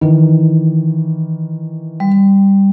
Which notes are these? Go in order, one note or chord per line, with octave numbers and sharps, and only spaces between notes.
D#3 E3
G3